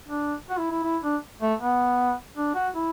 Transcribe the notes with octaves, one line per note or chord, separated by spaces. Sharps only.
D4
F#4
E4
E4
E4
D4
A3
B3
D4
F#4
E4